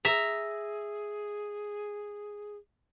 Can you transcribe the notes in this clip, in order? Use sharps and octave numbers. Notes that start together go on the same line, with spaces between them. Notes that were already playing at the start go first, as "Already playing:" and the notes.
G#4 E5 A#5